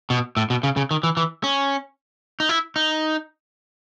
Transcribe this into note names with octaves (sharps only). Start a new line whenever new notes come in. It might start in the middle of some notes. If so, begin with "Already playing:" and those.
B2
A2
B2
C#3
C#3
D#3
E3
E3
C#4
D#4
E4
D#4